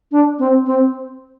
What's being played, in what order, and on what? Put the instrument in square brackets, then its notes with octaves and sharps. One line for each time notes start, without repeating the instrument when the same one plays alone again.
[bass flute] D4
C4
C4